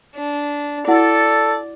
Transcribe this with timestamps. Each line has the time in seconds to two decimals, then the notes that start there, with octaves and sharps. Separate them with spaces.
0.16 D4
0.88 E4 F#4 A4 D5 F#5